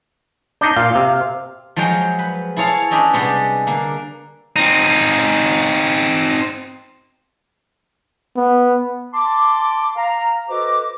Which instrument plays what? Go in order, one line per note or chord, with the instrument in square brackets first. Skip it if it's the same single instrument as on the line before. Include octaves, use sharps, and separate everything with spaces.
[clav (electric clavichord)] D4 D#4 [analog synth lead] G6
[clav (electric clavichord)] A#2 [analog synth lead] F5
[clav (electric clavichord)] C3
[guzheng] F3 F#3 G#3 C#5 G5
B4
E4 G#4 A4 C#5 F5
C#4 D4 D#5 G5 B5
C3 G3 G#3 B3
D3 A#3
[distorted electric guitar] C4 D#4
[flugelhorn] B3
[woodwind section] A5 C6 D6
F5 A#5
F#4 A4 B4 C5 D#5 D6